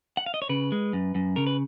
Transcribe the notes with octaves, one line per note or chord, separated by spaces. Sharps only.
F#5
F5
D#5
C#5
C#3 B4
G#3
F#2
F#2
C#3 A#4
B4